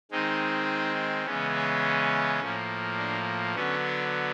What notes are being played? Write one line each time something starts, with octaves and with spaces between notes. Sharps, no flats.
D#3 G#3 C4 D#4
C#3 E3 G#3 B3 C#4
C#4
A2 F3 A#3
D4
D3 F#3 B3 C#4
D4